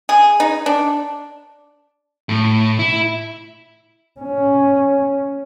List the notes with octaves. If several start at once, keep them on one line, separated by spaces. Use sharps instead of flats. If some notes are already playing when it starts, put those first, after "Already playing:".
G#4
D#4
D4
A2
E4
C#4